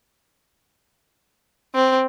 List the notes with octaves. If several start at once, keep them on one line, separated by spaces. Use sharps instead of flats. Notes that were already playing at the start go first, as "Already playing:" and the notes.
C4